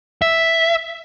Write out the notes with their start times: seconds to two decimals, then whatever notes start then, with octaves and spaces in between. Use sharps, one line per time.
0.22 E5